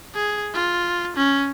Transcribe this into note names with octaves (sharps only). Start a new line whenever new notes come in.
G#4
F4
C#4